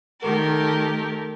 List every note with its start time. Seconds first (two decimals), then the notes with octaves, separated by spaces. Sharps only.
0.21 D#3 A3 G4 A#4